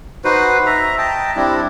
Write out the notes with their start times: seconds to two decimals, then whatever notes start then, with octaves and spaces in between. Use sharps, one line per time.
0.24 D#4 F#4 B4 C5
0.66 E5 A#5
0.98 D#5 G5 A5
1.36 G3 C4 D4 E4